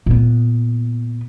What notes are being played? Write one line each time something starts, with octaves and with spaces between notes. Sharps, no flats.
A#2 B3